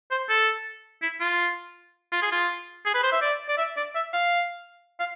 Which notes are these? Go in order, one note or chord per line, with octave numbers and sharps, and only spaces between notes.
C5
A4
E4
F4
F4
G#4
F4
G#4
B4
C5
E5
D5
D5
E5
D5
E5
F5
F5